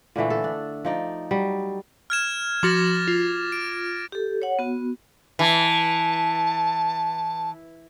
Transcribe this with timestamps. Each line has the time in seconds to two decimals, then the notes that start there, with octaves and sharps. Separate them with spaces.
0.16 A#2 D3 E3 A3
0.30 A4
0.44 D4
0.85 F3 D#4 D5
1.31 F#3 G3
2.10 F6 G#6 E7
2.63 F3 F#4 D6 A6 A#6
3.08 F4
3.52 D7
4.12 G4 A4
4.42 C#5 F#5
4.59 B3 F#4
5.39 E3 A5